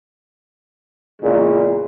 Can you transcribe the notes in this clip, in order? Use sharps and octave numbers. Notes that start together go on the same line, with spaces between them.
E2 A#2 C#3 G#3